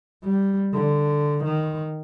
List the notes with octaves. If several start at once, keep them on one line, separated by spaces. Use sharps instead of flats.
G3
D3
D#3